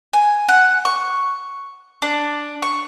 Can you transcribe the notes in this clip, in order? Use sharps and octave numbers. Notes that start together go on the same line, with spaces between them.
G#5
F#5
C#6
D4
C#6